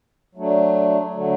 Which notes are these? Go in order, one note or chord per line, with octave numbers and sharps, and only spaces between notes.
F#3 A3 D4
D3 F#3 A3